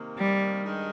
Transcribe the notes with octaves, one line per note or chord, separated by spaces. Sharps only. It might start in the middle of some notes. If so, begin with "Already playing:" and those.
Already playing: C3 D#3 A#3
G3
G2 D#3 G#3 D#4